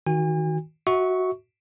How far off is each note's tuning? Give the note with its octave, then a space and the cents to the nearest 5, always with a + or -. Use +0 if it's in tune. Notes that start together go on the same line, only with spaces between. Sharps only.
D#3 +20 F#4 +0 G#5 -40
F#4 +0 E5 -30 C#6 +5